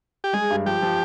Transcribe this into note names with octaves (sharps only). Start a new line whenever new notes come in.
G4
G#3 G#4
G2
F3 G4
F3